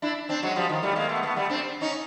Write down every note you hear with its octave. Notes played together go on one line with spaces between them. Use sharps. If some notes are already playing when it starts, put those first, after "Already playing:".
D4 E4
C4 D4
F#3 G#3
F3 G3
D#3
G3 A3
G#3 A#3
A3 B3
A3 B3
G3 A3
C4 D4
C#4 D#4